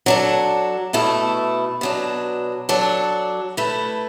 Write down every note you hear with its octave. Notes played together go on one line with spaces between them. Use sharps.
F#3 D4 A4
B2 A3 E4 A4
B2 F#3 D4
F#3 D4 A4
A3 E4 B4